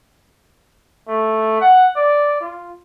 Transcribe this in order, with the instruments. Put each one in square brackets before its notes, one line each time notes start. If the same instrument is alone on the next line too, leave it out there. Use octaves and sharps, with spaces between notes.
[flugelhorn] A3
F#5
D5
F4